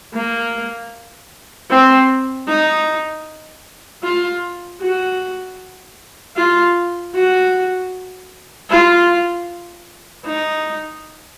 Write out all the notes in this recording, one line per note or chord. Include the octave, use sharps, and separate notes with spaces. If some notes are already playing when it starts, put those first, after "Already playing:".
A#3
C4
D#4
F4
F#4
F4
F#4
F4
D#4